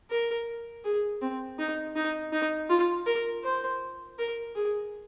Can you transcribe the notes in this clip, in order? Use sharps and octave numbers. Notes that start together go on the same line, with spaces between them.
A#4
G#4
C4
D#4
D#4
D#4
F4
A#4
C5
A#4
G#4